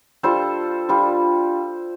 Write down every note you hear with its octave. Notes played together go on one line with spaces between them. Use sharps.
G3 D4 F4 A4 C5
G3 D4 F4